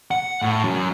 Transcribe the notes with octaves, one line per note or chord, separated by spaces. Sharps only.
F#5
A2
F#2